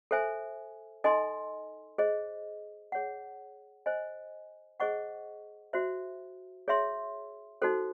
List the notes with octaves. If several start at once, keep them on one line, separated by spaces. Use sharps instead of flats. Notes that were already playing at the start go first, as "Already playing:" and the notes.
A4 C5 E5 G#5
D#4 A4 D#5 G#5 C6
G#4 C5 D#5
G#4 C#5 F#5
C5 D#5 G#5
G#4 C5 D#5 F#5 C#6
F#4 C5 E5
G#4 C#5 E5 C6
D#4 F#4 A4 C5